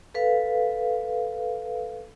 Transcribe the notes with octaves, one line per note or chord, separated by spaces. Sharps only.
A4 B4 F5